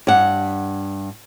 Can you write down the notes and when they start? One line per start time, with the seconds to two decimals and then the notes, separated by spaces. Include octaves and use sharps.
0.07 G2 F#5